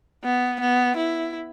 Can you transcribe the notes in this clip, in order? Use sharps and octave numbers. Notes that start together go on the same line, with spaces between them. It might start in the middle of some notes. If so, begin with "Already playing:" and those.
B3
B3
E4